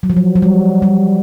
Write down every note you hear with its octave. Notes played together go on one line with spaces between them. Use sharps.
F#3
F3
F#3
F#3
G3
G3